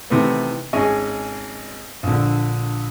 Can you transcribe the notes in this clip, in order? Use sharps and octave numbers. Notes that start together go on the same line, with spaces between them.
C3 D#3 E3 A3 B3
G#1 C#4 G#4 D#5
A#1 D3